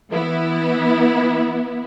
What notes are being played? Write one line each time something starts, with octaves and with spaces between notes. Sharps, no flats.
E3 B3 E4